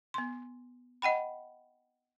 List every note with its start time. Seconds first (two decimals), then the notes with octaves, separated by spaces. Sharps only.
0.14 B3 C6
1.02 D#5 F#5 G5 B5